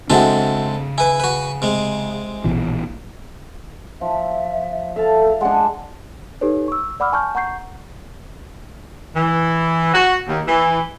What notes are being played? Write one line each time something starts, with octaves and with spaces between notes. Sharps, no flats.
C#3 G#3 C4 D4 F#4 A4 E5 F#5
E4 B4 G#5
F#4 B4
C3 G#3
A#1 B2 E3
F3 E5
A4 E5 F5 A5
G#3 D4 F#5
D#4 G4 A4 B4 C#5
C#6 E6
D5 F#5 B5 D6 E6 F6
G#5 A5 C#6 F6 G6
F#5 A#5 C#6 G6 C7
E3
F#4
D#2
E3